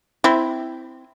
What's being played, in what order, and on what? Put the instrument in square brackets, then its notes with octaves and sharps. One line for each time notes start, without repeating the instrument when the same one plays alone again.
[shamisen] C4 E4